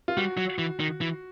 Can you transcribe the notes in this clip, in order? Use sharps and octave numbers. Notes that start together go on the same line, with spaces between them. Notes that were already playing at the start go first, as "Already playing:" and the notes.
F4
G3 F#4
F#3
E3
D#3
E3